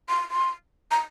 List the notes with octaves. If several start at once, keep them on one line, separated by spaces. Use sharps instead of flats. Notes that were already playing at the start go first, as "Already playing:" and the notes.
C6
C6
A#5